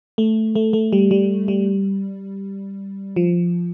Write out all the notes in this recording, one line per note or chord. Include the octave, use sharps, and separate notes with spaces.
A3
A3
A3
G3
G3
G3
F3